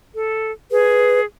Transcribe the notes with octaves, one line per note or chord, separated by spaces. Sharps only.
A4
G#4 B4